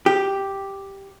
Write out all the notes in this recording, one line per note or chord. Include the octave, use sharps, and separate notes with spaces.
G4